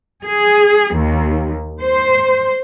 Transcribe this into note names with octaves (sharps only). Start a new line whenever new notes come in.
G#4
D#2
C5